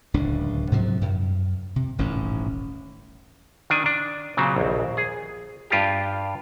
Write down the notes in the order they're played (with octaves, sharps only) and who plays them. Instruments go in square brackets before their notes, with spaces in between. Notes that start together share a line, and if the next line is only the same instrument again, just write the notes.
[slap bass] D1 C#2 D4
G#2 C3 F3 F#3
F#2
C3
D#1 A1 G#2 C#4
[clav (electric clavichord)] D#3 D4 G#5
D4
A#2 C#3 F#3 C4
A#1 D#2
G#4
G2 F4 G4